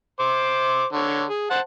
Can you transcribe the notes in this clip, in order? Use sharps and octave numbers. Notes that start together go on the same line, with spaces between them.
C5 D6
D3 C#5
G#4
C5 F#5 A5